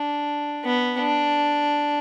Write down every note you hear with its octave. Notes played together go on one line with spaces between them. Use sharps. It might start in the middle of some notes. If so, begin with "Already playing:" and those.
Already playing: D4
B3
D4